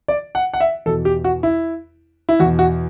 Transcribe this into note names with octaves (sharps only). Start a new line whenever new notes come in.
D5
F#5
F#5
E5
E2 B2 A4
G4
F#4
E4
E4
E2 B2 F#4
F#4